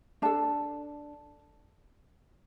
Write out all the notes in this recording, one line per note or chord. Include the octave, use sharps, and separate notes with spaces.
D4 A4 A5